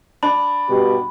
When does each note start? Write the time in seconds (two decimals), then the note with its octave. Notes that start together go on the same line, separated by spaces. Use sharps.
0.23 D4 B5
0.69 G2 B2 G4